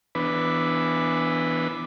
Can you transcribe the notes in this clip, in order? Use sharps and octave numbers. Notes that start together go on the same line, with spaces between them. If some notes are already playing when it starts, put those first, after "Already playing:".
E3 B3 D4 B4